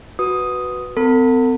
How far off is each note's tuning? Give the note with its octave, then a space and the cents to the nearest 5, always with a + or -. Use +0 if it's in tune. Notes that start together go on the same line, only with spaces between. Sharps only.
F#4 +0 B4 +0 D#6 +0
C4 -40 A4 +45 B5 +0